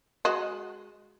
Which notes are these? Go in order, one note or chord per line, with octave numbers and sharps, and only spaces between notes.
G#3 F#4 D#5